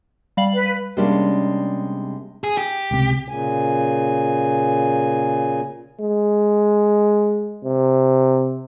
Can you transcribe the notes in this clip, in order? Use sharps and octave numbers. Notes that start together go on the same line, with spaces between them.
G3 F5 F#7
B4
C3 G3 G#3 A#3 C#4 D4
G#4
G4
C#2 C3
A#2 C#3 G#5
G#3
C3